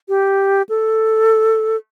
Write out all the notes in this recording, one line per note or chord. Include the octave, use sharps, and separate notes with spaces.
G4
A4